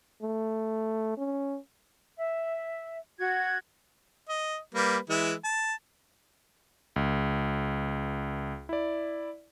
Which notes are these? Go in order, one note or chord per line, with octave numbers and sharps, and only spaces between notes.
A3
C#4
E5
F#4 G#6
D#5
G3 A#3 B4
E3 G#3 E4
A5
C#2
E4 D5